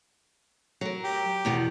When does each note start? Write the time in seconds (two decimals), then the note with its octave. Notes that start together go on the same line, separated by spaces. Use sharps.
0.81 F#3 A#4
1.04 G4
1.45 E2 B2 D#3